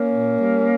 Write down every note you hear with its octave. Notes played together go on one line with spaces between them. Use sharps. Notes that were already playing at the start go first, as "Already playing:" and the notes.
Already playing: A#3 C#4
A#2
G3